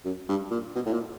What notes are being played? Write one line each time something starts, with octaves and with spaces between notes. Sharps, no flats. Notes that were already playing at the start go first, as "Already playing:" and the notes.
F#2
G2
A#2
B2
A2
A#2